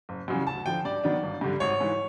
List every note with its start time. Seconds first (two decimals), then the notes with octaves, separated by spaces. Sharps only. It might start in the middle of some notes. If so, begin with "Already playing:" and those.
0.09 F#1
0.28 F#2 C#3 E3 G3
0.47 D2 A5
0.66 D3 F3 G5
0.85 G2 D5
1.04 D#3 F#3 B3 D4
1.23 G1
1.41 G2 D3 G3
1.60 G#1 C#5
1.80 G#2 E3